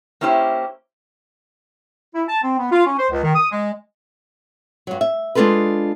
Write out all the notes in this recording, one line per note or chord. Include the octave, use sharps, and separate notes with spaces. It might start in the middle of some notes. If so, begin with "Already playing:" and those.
A#3 C#4 E4 G4 C5
E4
A5
C4
B3
F4
C#4
C5
C#2
D#3
D#6
G#3
G2 F#3
E5
G#3 D4 D#4 F4 A4 B4